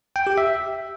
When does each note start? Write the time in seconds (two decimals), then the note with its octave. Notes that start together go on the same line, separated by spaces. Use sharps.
0.16 G5
0.27 G4
0.38 E5